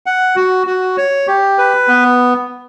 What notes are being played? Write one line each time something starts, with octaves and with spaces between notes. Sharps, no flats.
F#5
F#4
F#4
C#5
G4
B4
B3